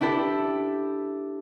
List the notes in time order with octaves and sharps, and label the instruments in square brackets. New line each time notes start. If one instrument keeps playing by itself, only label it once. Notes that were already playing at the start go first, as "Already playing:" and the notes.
[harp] D4 E4 G4 A4